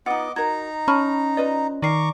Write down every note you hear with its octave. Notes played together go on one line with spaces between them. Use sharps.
B3 D#4 F4 D#5 F#5 D6
D#4 F#4 A#4 A#5 G#6
C#4 A5 B5 C#6 F6
F4 B4 D5 D#5
D#3 D5 A#5 C#6 D6 C7